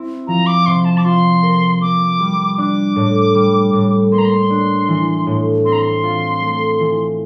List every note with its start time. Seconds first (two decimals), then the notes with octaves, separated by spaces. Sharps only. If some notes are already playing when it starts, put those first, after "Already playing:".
Already playing: C4 E4
0.27 F3 A#5
0.46 D6
0.66 C3 C6
0.85 A5
0.98 D6
1.05 F4 C6
1.43 A#4
1.81 A#3 D6
2.20 G3
2.58 D4 D6
2.96 A2
3.35 G3
3.73 A2
4.12 A#3 C6
4.18 A#5
4.25 C6
4.50 D4
4.88 E3
5.27 A2
5.65 C4 C6
5.73 A#5
5.79 C6
6.03 F4
6.42 A3
6.80 E3